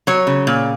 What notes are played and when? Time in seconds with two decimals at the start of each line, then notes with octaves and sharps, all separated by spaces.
0.07 F#3 C#5
0.27 C#3
0.47 A#2